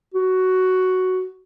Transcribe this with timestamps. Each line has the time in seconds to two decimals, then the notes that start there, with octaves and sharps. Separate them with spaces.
0.14 F#4